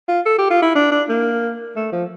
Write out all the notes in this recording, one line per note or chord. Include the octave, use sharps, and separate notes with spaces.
F4
A4
G4
F4
E4
D4
D4
A#3
A3
F3